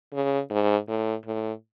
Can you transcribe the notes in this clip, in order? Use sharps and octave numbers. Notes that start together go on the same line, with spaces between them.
C#3
G#2
A2
A2